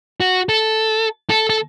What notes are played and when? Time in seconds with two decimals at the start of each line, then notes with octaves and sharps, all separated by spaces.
0.20 F#4
0.49 A4
1.30 A4
1.50 A4